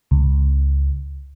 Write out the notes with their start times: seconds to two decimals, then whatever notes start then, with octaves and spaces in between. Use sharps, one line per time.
0.11 C#2